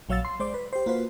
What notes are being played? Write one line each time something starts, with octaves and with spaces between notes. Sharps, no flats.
A#1 F#3 C#5 F5 E6 A6
C6
G#3 C5 D5
B4
G4 C5
A#3 F4 F#4 B4 C5